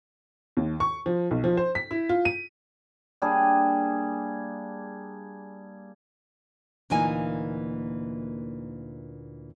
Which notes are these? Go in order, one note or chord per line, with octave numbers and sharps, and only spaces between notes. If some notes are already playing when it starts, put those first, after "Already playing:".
D#2
C#6
F3
B1
F3
C5
B6
E4
F4
D#7
G3 A#3 D4 G#4
D2 A#2 E3 A#3 D#4 G#5